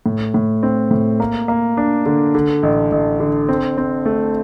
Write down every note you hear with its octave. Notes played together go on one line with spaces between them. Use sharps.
A2
A2
C4
A2
A#3
A#3
D4
D3
D3
A1
A1
D3
C4
C4
A3